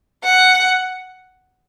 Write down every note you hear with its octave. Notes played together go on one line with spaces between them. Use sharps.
F#5